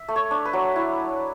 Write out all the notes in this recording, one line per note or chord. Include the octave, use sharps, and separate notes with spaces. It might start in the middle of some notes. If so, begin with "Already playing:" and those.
Already playing: E5
A3
C#5
D4
B4
F#3
E4